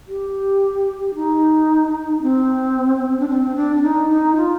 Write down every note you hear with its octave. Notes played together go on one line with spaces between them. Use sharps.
G4
D#4
C4
D4
C4
D4
D4
D#4
D#4
F4